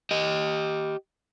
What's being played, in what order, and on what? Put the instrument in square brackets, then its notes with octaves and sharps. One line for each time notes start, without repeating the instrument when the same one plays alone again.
[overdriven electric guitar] G4 D#5